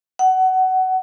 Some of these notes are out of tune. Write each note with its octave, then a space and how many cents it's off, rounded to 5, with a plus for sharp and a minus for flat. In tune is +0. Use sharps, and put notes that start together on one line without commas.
F#5 +20